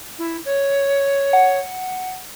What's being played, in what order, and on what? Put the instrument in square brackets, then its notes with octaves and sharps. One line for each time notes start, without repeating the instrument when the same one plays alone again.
[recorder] E4
C#5
[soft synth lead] F#5